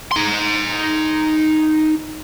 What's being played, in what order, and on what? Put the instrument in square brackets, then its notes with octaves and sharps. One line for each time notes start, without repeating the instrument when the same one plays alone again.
[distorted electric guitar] D#4 C6